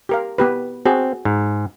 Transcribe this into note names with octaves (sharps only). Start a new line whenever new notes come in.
G4 A#4 F5
B3 G4 B4
C4 F#4 G#4
G#2